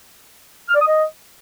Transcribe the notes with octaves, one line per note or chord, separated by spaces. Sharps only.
F6
D5
D#6
D#5